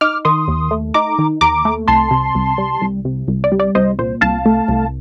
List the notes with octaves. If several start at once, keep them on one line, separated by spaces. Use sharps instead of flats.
D#4 D6 F6
D#3 C6 D#6
D#2
A3
D#4 A#5 D6
D#3
D#2 A#5 D6
A3
C2 A5 C6
C3
C2
G3
C2
C3
C2
D5
G3
D5
C2 C5 D#5
A#2 C5
C2 F5 A5
A3
C2